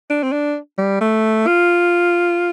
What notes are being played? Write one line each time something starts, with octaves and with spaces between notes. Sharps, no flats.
D4
C4
D4
G3
A3
F4